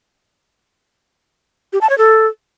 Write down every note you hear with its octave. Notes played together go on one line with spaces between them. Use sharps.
G4
A5
C#5
A4